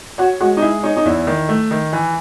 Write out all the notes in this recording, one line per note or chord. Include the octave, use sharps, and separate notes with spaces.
F#4 C#5
G#3 F#4
D#4
E4 G#4
D#4 C#5
D#4
E2 E4
D#3
A3
D#3
E3